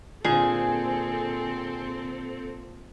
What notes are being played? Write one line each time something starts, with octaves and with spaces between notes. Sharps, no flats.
A#2 D3 C4 G#4 A4 G#5